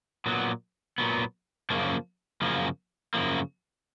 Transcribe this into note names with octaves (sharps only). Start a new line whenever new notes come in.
A#2 F#3 B3
A#2 F#3 B3
F#2 C#3 F3 A#3
F#2 C#3 F3 A#3
F#2 C#3 F3 A#3